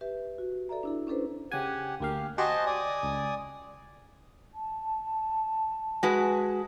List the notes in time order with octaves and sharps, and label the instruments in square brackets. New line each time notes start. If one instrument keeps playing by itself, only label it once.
[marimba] G4 B4 E5
F#4
A4 D5 E5 A#5
D4 E4 A4
C#4 D4 A4 B4 C5
[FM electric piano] C#3 G#5 [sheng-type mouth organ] G4 F#5
[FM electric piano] D2 A#3 F5 [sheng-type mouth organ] G4
[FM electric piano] F#4 G4 C5 [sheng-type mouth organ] D#5 G#5 A5
[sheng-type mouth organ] D5 G#5 D#6
[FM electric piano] C#2
[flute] A5
[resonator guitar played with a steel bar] G#3 F#4 B4